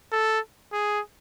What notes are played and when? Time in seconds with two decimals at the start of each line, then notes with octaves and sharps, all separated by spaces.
0.12 A4
0.72 G#4